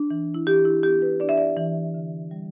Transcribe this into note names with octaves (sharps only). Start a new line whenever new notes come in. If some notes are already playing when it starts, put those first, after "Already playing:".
Already playing: D4
E3
E4
E3 G4
E4
B3 G4
B4
D4 D5
E5
D5
E3
D3
G3